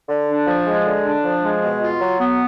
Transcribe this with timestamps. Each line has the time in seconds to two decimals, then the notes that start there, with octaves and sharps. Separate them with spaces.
0.08 D3
0.28 D4
0.47 F3
0.66 G#3
0.85 D3
1.05 D4
1.24 F3
1.44 G#3
1.62 B2
1.81 F4
2.01 F#3
2.20 B3